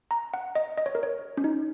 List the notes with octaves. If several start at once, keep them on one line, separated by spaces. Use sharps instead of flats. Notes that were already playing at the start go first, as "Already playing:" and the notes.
A#5
F#5
D#5
D#5
C#5
A#4
C#5
C#4
D#4